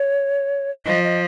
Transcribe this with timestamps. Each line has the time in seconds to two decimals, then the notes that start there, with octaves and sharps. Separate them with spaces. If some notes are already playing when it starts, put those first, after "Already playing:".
Already playing: C#5
0.86 F3 D#5
1.03 D#5